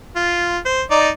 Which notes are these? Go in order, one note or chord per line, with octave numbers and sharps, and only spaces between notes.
F4
C5
D#4 D5